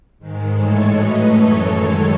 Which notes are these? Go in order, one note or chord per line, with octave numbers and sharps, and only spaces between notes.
G#2 D#3 G#3
A2 E3 G#3 A4 C#5
A2 F#3 A3 B4 D#5
F#2 E3 A3 A4 C#5
F#2 D#3 G#3